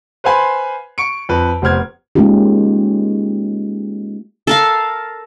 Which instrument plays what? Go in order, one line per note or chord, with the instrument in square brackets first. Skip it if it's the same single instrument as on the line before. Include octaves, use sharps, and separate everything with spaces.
[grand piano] B4 C5 F5 G#5 B5 C6
C#6 C#7 D7
F2 B4
F1 B3 C5 F6 G#6
[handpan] G#3 A#3 C#4 D#4 F4 G4
[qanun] A4 A#4 F5